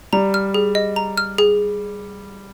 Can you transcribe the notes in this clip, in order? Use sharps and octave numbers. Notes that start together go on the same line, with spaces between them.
G3 A#5
F6
G#4
D#5
A#5
F6
G#4